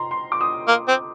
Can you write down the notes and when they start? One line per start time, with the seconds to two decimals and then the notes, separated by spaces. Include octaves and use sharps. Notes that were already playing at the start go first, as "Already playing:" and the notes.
Already playing: A#5 C6
0.11 C6
0.32 D6
0.41 D#6
0.68 A#3
0.88 C4